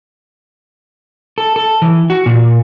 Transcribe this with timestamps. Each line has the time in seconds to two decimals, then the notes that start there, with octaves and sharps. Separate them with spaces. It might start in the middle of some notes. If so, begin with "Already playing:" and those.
1.38 A4
1.56 A4
1.82 E3
2.10 F#4
2.26 A#2